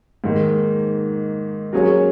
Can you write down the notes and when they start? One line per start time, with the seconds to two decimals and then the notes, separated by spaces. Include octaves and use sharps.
0.24 G#2 D#3 A#3
1.73 F#3 A#3 C#4 G#4 C#5